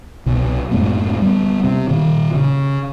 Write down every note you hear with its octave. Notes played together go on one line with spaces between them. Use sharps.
C2 B2
F#2 A2 G#3 B3
G3 B3
C3
A#2 D#3
C#3